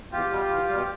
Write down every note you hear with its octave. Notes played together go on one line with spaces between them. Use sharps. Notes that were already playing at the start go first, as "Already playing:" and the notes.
E2 F4 G4
B2 G3
E2
B2 G3